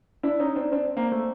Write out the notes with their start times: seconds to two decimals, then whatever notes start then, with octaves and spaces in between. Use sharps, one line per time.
0.23 D4 E4
0.40 C#4 D#4
0.56 C4 D4
0.72 C4 D4
0.97 A#3 C4
1.12 A3